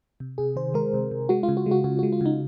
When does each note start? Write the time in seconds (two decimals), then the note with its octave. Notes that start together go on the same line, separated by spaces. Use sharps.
0.20 C3
0.38 C3 G#4
0.56 D#3 C5
0.74 G#3 A#4
0.94 C3
1.12 C3
1.29 G#3 F#4
1.43 F4
1.49 C#3
1.57 F#4
1.66 G#3
1.71 F#4
1.84 C#3 F#4
1.99 G#3 F#4
2.12 F4
2.21 C#3 D#4